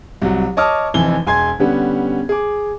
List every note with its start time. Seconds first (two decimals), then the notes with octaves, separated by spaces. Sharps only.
0.22 C2 F#3
0.57 C#5 D#5 A5 D6 D#6 F6
0.94 F1 F2 E3 G#5 G7
1.27 E1 G#5 C6 G#6
1.59 D3 G3 B3 C#4
2.29 G#4 D6